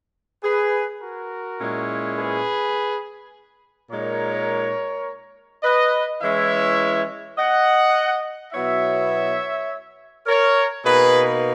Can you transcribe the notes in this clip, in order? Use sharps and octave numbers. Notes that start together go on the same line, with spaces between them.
G#4 B4
F#4 A#4
A#2 G#3 C#4 E4
G#4 B4
A#2 G#3 D#4 A#4 C#5
B4 D#5
E3 G#3 C#4 E4 C#5 E5
D#5 F#5
B2 F#3 B3 E4 C#5 E5
A#4 C#5
B2 A#3 D#4 G#4 B4